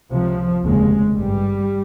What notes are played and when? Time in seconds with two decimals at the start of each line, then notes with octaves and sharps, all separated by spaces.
0.11 C#2 C3 F3
0.63 F1 D#2 C#3 G#3
1.16 G#1 G2 G3